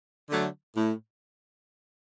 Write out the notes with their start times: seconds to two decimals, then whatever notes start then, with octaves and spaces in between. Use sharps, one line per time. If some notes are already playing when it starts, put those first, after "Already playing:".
0.30 D3 F#3 A3
0.76 A2